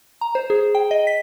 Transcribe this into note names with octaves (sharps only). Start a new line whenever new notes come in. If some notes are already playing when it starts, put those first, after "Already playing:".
A#5
C5
G#4
G5
D#5
B6